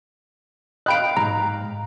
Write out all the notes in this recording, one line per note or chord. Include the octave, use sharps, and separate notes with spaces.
D#5 F5 G5 B5 F#6 D7
B1 G#2 A#5